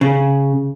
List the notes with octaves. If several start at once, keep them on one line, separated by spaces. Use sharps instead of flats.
C#3